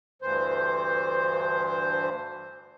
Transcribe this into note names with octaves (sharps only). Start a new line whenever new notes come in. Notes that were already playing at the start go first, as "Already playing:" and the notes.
D2 G2 E3 C5